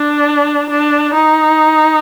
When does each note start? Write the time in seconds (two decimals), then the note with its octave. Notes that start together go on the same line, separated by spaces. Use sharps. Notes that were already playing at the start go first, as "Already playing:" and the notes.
Already playing: D4
0.70 D4
1.14 D#4